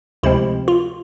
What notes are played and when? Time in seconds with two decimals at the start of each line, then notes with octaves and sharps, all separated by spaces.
0.23 D2 C3 F3 G#3 C4 E4
0.68 F4